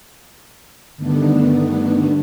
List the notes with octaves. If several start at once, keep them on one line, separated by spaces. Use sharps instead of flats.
G2 D3 D#3 A3 B3 D4